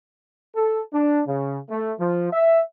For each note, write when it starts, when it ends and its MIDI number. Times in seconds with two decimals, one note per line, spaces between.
0.56 0.81 69
0.93 1.21 62
1.27 1.58 49
1.70 1.93 57
2.00 2.31 53
2.32 2.61 76